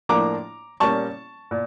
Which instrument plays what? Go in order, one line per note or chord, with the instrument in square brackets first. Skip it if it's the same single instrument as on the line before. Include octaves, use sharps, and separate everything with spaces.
[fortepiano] A2 F3 A#3 D4 A#5 D6
A#2 G3 A#3 C#4 A5 C#6
A#2